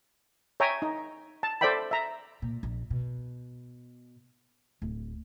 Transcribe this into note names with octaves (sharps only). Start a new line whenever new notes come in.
C#5 E5 G5 G#5 A#5
D#4
A5
A4 C5 D5 E5 G5 B5
E5 A#5
A#2
A#1
B2
D1